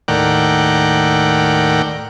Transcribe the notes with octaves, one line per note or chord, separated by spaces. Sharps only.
D#2 A2 A#4 D5 F#5 G5